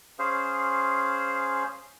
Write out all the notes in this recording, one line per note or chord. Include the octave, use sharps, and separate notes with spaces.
C#4 G#4 C5 F5